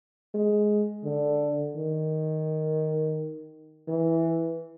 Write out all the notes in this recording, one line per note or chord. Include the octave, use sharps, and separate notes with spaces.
G#3
D3
D#3
E3